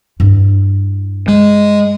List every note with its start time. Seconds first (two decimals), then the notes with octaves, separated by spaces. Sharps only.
0.20 G2 E4
1.28 G#3